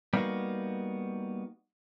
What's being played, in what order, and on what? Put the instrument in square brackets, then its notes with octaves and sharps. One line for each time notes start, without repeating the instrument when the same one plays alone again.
[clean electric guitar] G3 A#3 B3 D#4 F#4